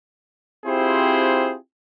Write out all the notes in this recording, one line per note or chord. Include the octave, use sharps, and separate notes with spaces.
C4 E4 F4 G4 G#4 C5